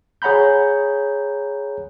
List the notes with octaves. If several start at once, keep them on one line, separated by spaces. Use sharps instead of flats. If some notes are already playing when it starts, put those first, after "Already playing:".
G#4 C#5 F#5 A#5 B5 G6